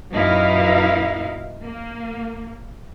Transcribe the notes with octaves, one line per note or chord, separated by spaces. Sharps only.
F#2 A#2 D#4 E4 B4 F5
A#3